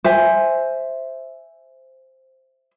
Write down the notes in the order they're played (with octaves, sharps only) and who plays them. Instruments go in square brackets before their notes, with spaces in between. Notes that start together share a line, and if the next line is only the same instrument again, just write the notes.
[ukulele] C5 E5 G#5